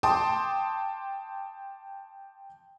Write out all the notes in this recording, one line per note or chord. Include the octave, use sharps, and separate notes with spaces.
G5 A5 C6 D6 D#6